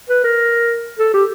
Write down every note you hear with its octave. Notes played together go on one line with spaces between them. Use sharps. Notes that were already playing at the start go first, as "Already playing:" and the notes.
B4
A#4
A4
G4